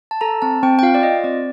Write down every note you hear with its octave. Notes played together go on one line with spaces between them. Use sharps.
A5
A4 A#5
C4 A5
C4 G5
G5
F4 F5
D5
F4 D#5
C4 D5